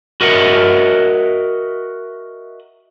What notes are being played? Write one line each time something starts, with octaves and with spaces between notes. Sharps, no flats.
F#4 A#4 D#5 E5 F#5